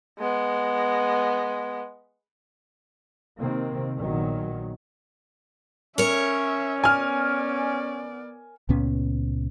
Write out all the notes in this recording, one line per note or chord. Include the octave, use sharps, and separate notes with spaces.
G#3 B3
C3 D#3 A#3 C4
A#1 A#2 D#3 F#3 B3
C#4 A#4 C#5 E5
B3 D5 G#5 F6
C#2 A#2 B3 C#4